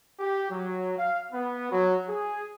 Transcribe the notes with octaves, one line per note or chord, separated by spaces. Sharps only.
G4
F#3
F5
B3
F#3
G#4